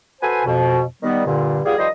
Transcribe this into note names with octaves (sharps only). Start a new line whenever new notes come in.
F#4 A4 B4 C5 G#5
F2 B2
D#3 G3 B3
G2 A#2 D3
G3 B3 F4 G#4
D#3 F3 G3 C5 D#5